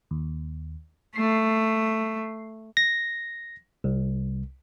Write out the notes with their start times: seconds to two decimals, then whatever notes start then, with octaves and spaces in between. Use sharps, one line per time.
0.11 D#2
1.16 A3 C7
2.77 A#6
3.84 C2